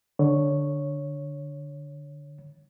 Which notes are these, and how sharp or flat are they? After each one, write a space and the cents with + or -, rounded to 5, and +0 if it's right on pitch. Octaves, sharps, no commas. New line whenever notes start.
D3 +0 C#5 +0